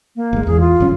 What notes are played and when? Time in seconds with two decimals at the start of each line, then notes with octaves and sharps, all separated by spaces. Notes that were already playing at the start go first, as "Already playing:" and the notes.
0.16 A#3
0.33 G#1 G#3
0.47 E2 G#4
0.60 F4
0.80 G1 F#2 C#4